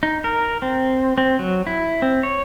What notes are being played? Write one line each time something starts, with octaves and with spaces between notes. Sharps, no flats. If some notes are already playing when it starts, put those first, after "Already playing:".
D#4
A#4
C4
C4
F#3
E4
C4
C#5